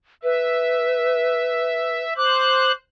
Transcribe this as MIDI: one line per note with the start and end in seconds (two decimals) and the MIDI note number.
0.23 2.03 71
0.23 2.13 76
2.17 2.72 72
2.17 2.72 86
2.17 2.72 90